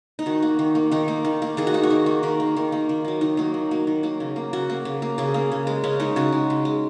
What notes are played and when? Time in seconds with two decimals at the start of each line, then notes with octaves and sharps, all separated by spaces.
0.19 D#4
0.26 D#3 F#4
0.43 A#3
0.59 D#3
0.75 A#3
0.91 D#3 D#4
1.08 A#3
1.25 D#3
1.42 A#3
1.57 D#3 G#4
1.67 F#4
1.74 A#3 D#4
1.83 F#4
1.90 D#3
2.06 A#3
2.23 D#3 A#4
2.40 A#3
2.57 D#3
2.72 A#3
2.89 D#3
3.05 F#3 A#3
3.21 D#3 D#4
3.37 F#3 A#3
3.54 D#3
3.71 F#3 A#3
3.87 D#3
4.03 F#3 A#3
4.20 C#3
4.36 A#3
4.53 C#3 F#4
4.70 A#3
4.85 C#3
5.02 A#3
5.18 C#3 G#4
5.34 A#3
5.52 C#3
5.67 G#3
5.84 C#3 C#4
6.00 G#3 D#4
6.16 C#3 F#4
6.32 G#3
6.50 C#3
6.65 G#3